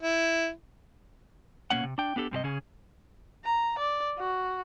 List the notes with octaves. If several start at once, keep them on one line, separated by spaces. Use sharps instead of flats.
E4
B2 D#3 A#3 C#4 F#5
C3
D4 G5
B3 D4 G4 A4
G2 C3 G4 D#5
C#3 C#4 G#4
A#5
D5
F#4